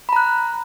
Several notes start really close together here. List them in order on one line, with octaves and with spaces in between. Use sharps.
B5 A#5 F#6